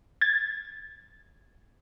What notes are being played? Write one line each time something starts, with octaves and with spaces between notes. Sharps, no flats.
G#6 A6